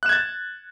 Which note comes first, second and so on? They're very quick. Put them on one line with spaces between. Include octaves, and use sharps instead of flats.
F#6 E7 G#6 A6